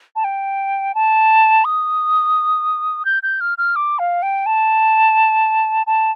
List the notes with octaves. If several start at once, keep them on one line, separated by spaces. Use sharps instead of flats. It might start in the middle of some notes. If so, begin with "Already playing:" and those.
A5
G5
A5
D#6
G6
G6
F6
F6
D6
F5
G5
A5
A5